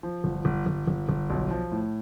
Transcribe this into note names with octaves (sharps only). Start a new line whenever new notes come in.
F3
G1
G1
G1
G1
G1
B1
F3
A2